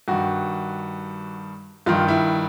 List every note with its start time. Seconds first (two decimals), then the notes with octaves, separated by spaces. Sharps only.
0.08 G2 D#3 F#4
1.86 G2 D#3 F4
2.08 E4